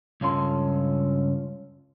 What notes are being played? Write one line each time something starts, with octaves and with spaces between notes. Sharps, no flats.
C#2 G2 C#4 F4 A4 C6